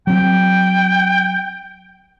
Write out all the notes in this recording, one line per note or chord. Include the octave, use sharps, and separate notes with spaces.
F#3 C4 G5